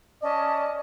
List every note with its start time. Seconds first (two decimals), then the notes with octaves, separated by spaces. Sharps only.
0.22 C#4 D5 D#5 A5